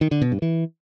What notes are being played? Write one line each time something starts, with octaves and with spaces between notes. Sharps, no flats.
D#3
D3
B2
G2
E3